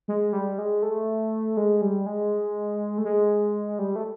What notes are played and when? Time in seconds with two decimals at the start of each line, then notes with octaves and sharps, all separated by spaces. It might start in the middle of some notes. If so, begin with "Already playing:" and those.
0.08 G#3
0.33 G3
0.58 G#3
0.82 A3
1.57 G#3
1.81 G3
2.06 G#3
2.98 A3
3.05 G#3
3.79 G3
3.96 A3